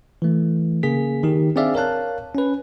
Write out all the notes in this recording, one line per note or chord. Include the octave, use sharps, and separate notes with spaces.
E3 A3
C#3 A#3 G#4 B6
D#3 D#4 G4
C4 D4 G#4 D5 E5 F5
A#4 C#5 F5 A5 F#6
C#4 B4